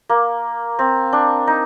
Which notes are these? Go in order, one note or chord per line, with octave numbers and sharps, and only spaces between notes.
A#3
C4
D4
D#4